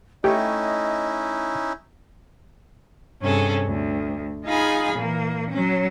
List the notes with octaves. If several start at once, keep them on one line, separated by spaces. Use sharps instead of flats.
A3 C#4 D#4 E4 G4 C#5 D#5 G5
G2 C3 C#4 G#4 A4
D2
D#4 F4 G#4 F5 G#5 B5
A#2 E3 A#3
F#3 C#4